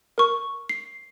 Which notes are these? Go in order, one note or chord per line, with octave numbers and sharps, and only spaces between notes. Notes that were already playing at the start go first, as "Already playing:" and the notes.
A#4 C#6
C7